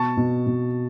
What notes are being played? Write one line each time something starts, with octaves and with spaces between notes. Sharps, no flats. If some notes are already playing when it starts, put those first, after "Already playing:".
Already playing: B2 A5 C#6
B2
B2